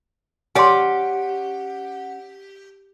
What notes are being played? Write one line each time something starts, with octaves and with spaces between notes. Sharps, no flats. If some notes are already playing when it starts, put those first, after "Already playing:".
C#4 G4 D5 F#5 G#5 C6